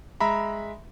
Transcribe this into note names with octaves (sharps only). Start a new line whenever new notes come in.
G#3 E5 A#5 B5